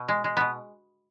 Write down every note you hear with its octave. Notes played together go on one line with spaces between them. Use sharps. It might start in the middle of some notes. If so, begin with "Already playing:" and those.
Already playing: B2
G#3
G#3
B2 B3